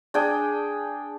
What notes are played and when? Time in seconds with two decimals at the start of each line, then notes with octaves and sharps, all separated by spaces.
0.14 D4 G#4 G5